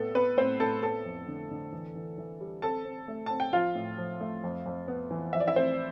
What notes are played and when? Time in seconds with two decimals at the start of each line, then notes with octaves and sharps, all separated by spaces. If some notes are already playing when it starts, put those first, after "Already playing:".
Already playing: A2 B3 A4
0.15 B3 B4
0.37 A2 C4 C5
0.60 A2 A4 A5
0.82 B3 A4 A5
1.05 F2
1.28 D3
1.51 D3
1.72 E3
1.95 E3
2.18 E3
2.41 G3
2.62 C4 A4 A5
2.85 C4
3.08 A3
3.26 C4 A5
3.40 G5
3.53 F3 F4 F5
3.75 A2
3.98 F3
4.21 A3
4.44 F2
4.66 F2
4.88 B3
5.11 E3
5.33 F3 E5
5.40 D5
5.48 E4 E5
5.56 A3 C4 C5